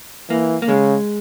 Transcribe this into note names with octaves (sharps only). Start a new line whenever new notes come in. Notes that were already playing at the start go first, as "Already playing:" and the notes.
E3 A#3
A#3
C#3 G#3